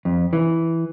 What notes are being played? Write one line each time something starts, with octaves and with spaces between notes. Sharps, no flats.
F2
E3